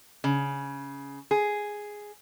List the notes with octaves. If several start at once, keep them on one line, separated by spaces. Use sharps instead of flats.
C#3
G#4